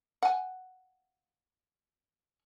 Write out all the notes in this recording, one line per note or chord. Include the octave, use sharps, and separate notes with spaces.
F#5 G#5